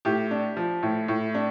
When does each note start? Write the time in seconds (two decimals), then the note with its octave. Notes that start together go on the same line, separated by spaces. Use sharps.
0.05 A2 G4
0.31 D4
0.57 F3
0.83 A2
1.08 A2
1.34 D4